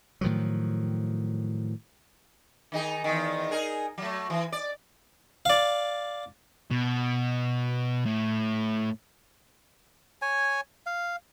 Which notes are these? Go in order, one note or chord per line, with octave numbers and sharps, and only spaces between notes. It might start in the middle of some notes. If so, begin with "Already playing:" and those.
A2 D#3 F3 F#3
D#3 D#4 G#4
E2 D#3
D#4 G#4 A#4
F#3 A3
E3
D5
D5 F5
B2
A2
C#5 G#5
F5